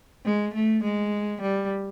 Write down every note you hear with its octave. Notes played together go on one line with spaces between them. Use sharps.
G#3
A3
G#3
G3